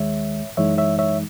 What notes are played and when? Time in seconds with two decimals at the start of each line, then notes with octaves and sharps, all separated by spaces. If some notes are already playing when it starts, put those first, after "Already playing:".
Already playing: D#2 D#3 G#3 C#5 E5
0.57 F#2 E3 G#3 D#4 C#5 E5
0.78 C#5 E5
0.99 C#5 E5